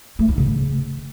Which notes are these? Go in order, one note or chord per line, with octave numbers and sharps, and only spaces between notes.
A3
D#4
C#3